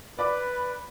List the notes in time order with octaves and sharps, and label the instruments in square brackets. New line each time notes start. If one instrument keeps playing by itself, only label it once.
[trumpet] B4 [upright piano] D5 B5 D6